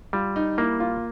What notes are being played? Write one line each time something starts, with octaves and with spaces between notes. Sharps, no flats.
G3 F4
D#4
A#3 E4
F4